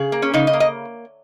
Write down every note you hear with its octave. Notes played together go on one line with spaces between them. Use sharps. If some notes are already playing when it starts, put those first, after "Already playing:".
Already playing: C#3 G#4
A#3
C#4
C#3 D#4
D#5
A#3
D#5